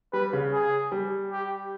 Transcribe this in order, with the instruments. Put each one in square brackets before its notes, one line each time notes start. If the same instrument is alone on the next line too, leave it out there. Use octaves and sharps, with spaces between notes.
[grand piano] G3 [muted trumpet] B4
[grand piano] C#3
[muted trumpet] G#4
[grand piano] G3
[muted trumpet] G4